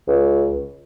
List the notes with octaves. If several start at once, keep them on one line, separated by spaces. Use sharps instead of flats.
C#2